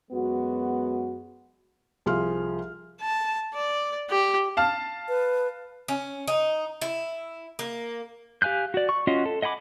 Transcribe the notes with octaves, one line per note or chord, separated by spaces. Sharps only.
F#2 G#3 B3 F#4
C2 F3 G#4 F5 C6 F6
A5
D5
G4
F5 A5 F6
B4
C#4
D#4
E4
A#3
G4 F5 G#5 F#6 G6
F#4 D5
C#6
C#4 F4 F#4 D#5 F#5
A4
D#5 F#5 G#5 B5 D6